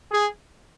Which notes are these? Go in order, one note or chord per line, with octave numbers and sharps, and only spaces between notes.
G#4